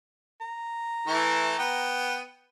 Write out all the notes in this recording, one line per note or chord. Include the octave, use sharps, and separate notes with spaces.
A#5
E3 A3 E4
B3 G5